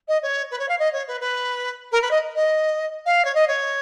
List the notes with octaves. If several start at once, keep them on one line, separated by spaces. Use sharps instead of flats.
D#5
C#5
B4
C#5
F5
D#5
C#5
B4
B4
A#4
B4
D#5
D#5
F5
C#5
D#5
C#5